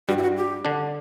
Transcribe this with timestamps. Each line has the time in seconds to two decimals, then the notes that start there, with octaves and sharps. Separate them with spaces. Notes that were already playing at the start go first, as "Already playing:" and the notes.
0.08 G2 G3 F#4
0.18 E4
0.22 F#4
0.37 G4
0.65 D3 D4